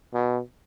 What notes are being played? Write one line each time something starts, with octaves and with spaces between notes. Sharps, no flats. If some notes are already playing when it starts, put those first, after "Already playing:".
B2